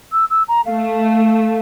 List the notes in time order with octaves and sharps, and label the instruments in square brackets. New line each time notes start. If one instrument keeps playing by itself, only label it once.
[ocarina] E6
E6
A#5
[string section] A3 [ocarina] F5